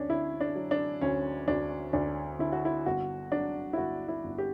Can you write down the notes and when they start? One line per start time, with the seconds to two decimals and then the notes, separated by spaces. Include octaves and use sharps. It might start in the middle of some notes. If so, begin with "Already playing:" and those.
Already playing: D2 C#4 D4
0.09 D3 E4
0.41 D4
0.56 F#3
0.71 D4
1.01 D2 C#4
1.48 D2 D4
1.93 D2 D4
2.39 D3 E4
2.52 F#4
2.65 E4
2.86 G1 F#4
3.32 F#3 D4
3.73 E4
3.77 G1 F#4
4.08 E4
4.24 G1
4.38 G4